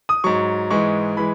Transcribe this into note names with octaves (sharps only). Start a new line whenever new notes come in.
D#6
G#2 F#3 C#6
G#2 E3 G#3 C#6
E3 G#3 B5